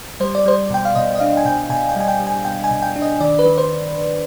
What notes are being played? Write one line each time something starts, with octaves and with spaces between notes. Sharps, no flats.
G3 C5
D5
G3 C5
B2 G5
F5
B2 D#5
D#5
D4 F5
G#5
B2 G5
B2 G#5
G5
G3 G#5
G5
G3
G#5
B2 G5
G#5
B2
G5
D4
D#5
D#3 D5
B4
D#3
C5